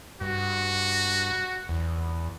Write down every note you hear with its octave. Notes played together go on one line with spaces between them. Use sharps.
G2 F#4
E2